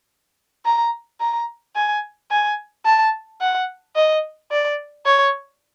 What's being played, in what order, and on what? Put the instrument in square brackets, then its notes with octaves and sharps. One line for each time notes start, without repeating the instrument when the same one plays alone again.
[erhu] A#5
A#5
G#5
G#5
A5
F#5
D#5
D5
C#5